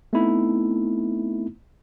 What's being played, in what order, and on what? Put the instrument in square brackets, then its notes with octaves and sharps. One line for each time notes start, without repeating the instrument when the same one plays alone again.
[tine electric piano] A3 B3 C4 D#4 E4